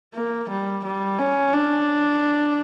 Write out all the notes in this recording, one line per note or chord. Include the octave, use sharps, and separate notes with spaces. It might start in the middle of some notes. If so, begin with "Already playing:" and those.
A#3
G3
G3
C#4
D4